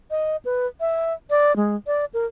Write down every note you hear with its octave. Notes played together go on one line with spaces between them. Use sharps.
D#5
B4
E5
D5
G#3
D5
A#4